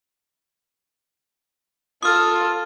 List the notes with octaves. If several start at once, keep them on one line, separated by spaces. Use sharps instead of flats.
F4 A4 D#6 F6